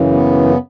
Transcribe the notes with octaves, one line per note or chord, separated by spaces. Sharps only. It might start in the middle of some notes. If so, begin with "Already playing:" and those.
Already playing: F#2 C#3 E3
B3
C#4